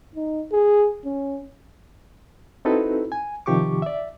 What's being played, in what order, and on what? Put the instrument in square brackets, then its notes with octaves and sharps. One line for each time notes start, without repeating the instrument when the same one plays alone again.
[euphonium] D#4
G#4
C#4
[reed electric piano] C4 D#4 E4 F#4 A4 B4
G#5
C3 D#3 F3 G4 C#6 D6
D5 E5